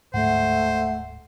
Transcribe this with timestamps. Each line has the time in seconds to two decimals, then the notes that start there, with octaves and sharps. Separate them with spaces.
0.14 D1 G#2 A3 C5 F#5